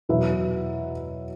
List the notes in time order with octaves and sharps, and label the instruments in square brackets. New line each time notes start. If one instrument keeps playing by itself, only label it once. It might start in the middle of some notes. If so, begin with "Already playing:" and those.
[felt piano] E2 B2 F#3 B4 E5